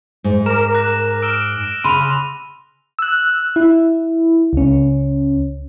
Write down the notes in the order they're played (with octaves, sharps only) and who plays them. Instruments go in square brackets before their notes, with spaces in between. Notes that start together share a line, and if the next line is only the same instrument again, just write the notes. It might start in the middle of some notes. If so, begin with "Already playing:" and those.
[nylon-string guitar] G#2
[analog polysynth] A#4 [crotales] D6 E7
[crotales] F#6 A#6
[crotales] E6 F6 E7 [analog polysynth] D7
[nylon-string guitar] C#3 [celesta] B5 C6 [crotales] D#7 F7
[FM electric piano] E6 F#6
E4
C#2 C#4